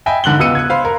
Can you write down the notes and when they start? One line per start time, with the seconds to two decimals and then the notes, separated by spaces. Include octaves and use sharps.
0.06 D#5 E5 G5 G#5 B5
0.24 G#2 D3 F#6 F#7 G7
0.39 C#2 B3 G4 E6 C#7 D#7
0.55 F#6 G#6
0.70 C5 F5 B5 C6
0.85 A#4